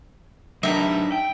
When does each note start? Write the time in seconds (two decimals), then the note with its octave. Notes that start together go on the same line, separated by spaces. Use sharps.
0.63 F#3 D4 D#4 E5
1.12 G5